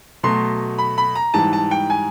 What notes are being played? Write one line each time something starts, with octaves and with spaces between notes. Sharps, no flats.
B2 F#3 A3 C6
B5
B5
A#5
G#2 E3 G3 A5
A5
G5
G#5